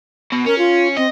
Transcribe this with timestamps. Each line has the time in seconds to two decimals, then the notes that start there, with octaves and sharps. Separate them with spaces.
0.32 B2
0.46 C#4 A#4
0.58 F4
0.97 C4 D#5